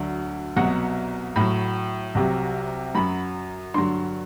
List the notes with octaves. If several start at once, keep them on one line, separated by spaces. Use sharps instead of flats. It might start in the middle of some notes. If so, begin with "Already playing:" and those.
Already playing: D2 D3 F#3
C2 B2 F#3 F#5
A2 F#3 B5
C2 C3 F#3
F#2 F#3 B5
G2 D3 F#3 C6